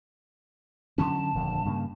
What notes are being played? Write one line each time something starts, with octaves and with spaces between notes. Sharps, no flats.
D3 F#3 C#4 A5
D#1 F2 D3
G2 C#3 A#3